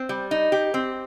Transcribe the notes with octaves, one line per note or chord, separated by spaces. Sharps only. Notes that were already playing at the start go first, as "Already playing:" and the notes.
Already playing: C4
G3
D#4
G4
C4